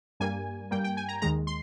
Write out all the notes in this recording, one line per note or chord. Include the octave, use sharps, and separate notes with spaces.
G2 G3 A#3 G#5
G2 G3 A#3 G5
G5
G#5
A#5
D#2 D#3 G#3 A#5
C6